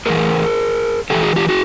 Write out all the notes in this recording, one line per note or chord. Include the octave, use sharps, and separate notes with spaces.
A2 E3 G#4 A#4
C3 E3 G4 A4
F#4 G#4
F4 G4
F#4 G#4